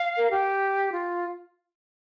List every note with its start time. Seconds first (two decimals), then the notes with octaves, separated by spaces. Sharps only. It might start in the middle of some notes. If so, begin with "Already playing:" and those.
Already playing: F5
0.17 A#4
0.29 G4
0.91 F4